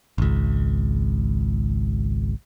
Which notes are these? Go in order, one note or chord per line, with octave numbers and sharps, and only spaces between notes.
G#1 C#2